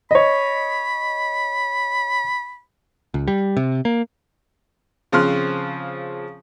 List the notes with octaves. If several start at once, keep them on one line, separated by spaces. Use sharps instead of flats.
C#5 D#5 B5
C#2
G3
C3
A#3
C#3 F3 C4 C6 F6 F#6